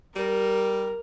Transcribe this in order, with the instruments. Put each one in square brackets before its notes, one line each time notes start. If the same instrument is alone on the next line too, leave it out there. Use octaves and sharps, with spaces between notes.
[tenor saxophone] G3 [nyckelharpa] A#4